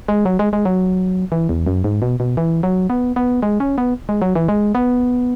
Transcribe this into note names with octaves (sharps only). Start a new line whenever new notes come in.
G#3
F#3
G#3
G#3
F#3
E3
E2
F#2
G#2
B2
B2
E3
F#3
B3
B3
G#3
C#4
B3
G#3
F#3
E3
G#3
B3